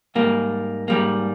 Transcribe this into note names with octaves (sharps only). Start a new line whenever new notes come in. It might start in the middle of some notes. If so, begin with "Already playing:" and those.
G#2 G3 A#3
G#2 G3 A#3